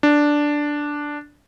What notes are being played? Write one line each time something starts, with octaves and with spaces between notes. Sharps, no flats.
D4